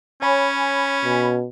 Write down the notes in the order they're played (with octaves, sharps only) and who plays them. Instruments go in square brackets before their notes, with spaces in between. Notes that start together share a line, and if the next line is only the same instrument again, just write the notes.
[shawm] C#4 [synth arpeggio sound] C#5 G#5 B5
[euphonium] B2